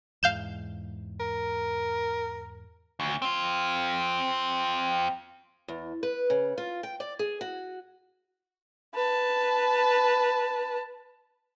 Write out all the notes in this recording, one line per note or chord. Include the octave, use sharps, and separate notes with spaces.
E2 G#2 F5 G6 E7
A#4
D2
C4 F4
E2
B4
C#3
F4
G5
D5
G#4
F#4
B4 A5